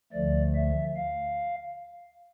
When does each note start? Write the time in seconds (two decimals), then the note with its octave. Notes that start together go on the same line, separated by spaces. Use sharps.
0.13 D2 D3 F3 A3 D5
0.55 E5
0.97 F5